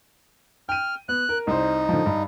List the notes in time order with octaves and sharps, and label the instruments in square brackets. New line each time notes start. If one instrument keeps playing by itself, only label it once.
[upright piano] G5 D#7 [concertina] F6
[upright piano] B3 [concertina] F#6
[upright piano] A#4
[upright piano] C2 C5 [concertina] D#4
[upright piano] D3 D#3 F3
G2